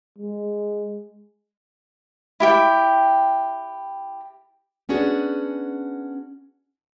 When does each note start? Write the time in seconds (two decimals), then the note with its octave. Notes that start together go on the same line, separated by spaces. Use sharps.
0.18 G#3
2.40 E4 G4 G5
4.89 B3 C#4 D4 F#4 G#4